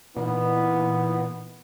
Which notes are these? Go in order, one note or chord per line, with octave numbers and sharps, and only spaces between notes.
A#2 E3 B3 D#4